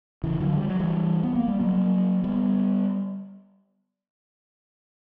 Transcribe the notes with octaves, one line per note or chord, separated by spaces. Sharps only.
C#3 E3
D3 F#3
G3
F#3
E3 G3
B3
A#3
G3
F#3 A#3
G3 B3